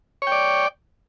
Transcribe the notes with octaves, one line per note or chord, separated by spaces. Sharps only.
C#5 D5 G5